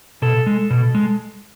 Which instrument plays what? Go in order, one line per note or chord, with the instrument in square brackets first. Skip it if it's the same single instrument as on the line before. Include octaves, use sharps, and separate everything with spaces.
[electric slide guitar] B2 A4
G#3
B2
G#3